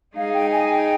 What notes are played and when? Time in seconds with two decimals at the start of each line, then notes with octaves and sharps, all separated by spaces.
0.16 G#3 D#4 G#4 F5
0.34 G5
0.52 G#5
0.70 G5